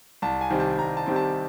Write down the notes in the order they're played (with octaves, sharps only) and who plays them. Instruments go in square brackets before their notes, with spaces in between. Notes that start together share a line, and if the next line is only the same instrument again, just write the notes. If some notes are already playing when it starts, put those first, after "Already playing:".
[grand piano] C2 A5
G#5
C3 D#3 G3 C4
A5
C2 A#5
A5
C3 D#3 G3 C4
A5